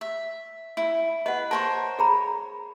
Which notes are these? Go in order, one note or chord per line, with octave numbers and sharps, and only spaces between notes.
E5
E4
B4 D#5 F#5
A#4 C5 C#5 A5
G#4 A#5 B5